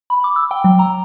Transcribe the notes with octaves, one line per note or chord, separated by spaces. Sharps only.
B5
D6
E6
G5
F#3
A#5